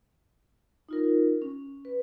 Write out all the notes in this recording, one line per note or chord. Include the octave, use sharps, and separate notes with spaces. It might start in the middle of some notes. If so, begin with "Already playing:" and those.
D#4 F4 A#4
C#4
B4